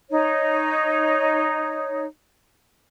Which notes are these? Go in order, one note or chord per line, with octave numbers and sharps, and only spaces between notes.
D#4 C#5